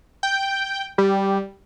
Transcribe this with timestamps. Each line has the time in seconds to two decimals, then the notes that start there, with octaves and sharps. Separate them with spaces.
0.23 G5
0.98 G3